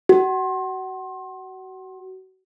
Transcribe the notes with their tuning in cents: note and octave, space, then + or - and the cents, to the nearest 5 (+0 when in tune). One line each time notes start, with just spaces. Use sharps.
F#4 +30